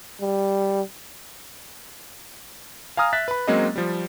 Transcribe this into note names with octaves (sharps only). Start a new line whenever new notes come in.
G3
F5 G#5 A#5 D#6 F6
E5 F#6 A6 B6
B4 B5
F#3 G#3 A#3 C4 C#4 D#5
F3 G3